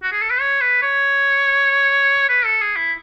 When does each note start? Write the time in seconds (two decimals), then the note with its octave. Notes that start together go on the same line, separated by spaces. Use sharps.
0.03 F#4
0.12 G#4
0.21 A4
0.30 B4
0.40 C#5
0.61 B4
0.82 C#5
2.29 B4
2.45 A4
2.61 G#4
2.76 E4